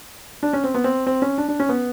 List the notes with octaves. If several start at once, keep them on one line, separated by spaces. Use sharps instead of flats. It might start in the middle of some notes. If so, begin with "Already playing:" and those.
D4
C#4
C4
B3
C4
C4
C#4
D4
D4
C#4
B3